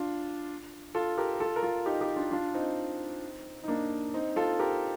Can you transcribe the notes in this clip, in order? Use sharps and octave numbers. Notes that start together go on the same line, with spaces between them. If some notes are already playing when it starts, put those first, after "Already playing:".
Already playing: D4 F4
F4 A4
G4 A#4
A#4
F4 A4
A#4
F4 A4
D#4 G4
D#4 G4
D4 F4
D4 F4
C4 D#4
D#4
A#3 D4
C4 D#4
F4 A4
G4 A#4